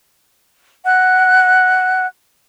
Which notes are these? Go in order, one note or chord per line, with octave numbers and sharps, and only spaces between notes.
D#5 F#5 F#6